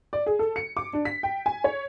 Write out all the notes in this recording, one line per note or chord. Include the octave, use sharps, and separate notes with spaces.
D5
G#4
A4
C#7
D6
D4
B6
G5
G#5
C#5